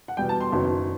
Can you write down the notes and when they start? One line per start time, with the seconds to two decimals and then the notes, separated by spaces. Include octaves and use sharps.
0.08 F#5
0.17 E2 B2 G3 B3 G5
0.29 A5
0.41 C6
0.52 F#1 F#2 D#3 F#3 B3